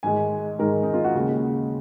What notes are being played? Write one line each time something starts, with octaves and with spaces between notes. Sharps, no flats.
G#2 D#3 G#3 G#5
G#2 D#3 G#3 A#4
D#4
F4
F#4
D#2 C#3 G#3 G#4